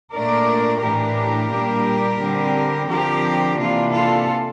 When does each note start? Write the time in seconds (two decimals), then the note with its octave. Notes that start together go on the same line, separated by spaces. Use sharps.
0.13 A#2 A3 D4 A#4 D5
0.82 A2 E3 A3 D4 G4 A#4
1.51 A#2 G3 A#3 D4
2.20 D3 G3 C4
2.89 D3 F3 C4 G4 A#4
3.58 C3 E3 A#3 D4 F4
3.93 F4 A4